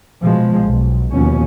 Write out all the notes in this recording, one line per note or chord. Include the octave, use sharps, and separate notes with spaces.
B2 F3 G#3
B1
D#2 B2 F3 C#4